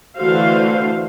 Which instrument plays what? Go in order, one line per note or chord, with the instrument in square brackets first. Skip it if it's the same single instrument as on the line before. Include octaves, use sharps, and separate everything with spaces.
[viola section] D3 E3 A3 F#4 C5 F5